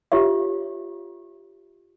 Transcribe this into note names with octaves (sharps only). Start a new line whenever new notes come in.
F4 G4 C#5 E5